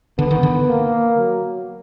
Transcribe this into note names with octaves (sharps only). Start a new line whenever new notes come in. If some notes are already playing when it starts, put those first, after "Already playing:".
D3 B3
D#3
D3
A#3
F#3